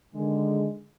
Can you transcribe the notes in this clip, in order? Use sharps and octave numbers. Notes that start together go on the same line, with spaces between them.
D3 D#3 G#3